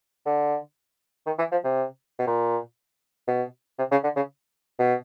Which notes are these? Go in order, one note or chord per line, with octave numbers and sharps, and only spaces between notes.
D3
D#3
E3
F3
C3
B2
A#2
B2
C3
C#3
D3
C#3
B2